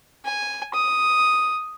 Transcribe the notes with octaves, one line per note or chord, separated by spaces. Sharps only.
G#5
D#6